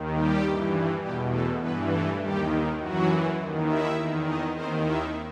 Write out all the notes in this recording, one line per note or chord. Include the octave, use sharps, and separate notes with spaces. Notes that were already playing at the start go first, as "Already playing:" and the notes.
Already playing: D#2 D#3
G3 G4
G2 E3
E2 B2 G3 G4
A3 A4
G2 E3 B3 B4
A3 A4
D#2 D#3 G3 G4
F#2 E3 F#3 F#4
D#2 D#3
E4 E5
E2 D#3
D#4 D#5
D#2 D#3 C4 C5
E4 E5